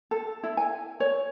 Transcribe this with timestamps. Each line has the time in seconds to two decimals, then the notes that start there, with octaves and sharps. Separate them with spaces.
0.11 A4
0.43 E4
0.57 G#5
1.00 C#5